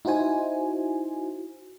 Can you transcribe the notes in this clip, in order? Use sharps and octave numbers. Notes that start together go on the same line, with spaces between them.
D#4 E4 F#4 C5 G#5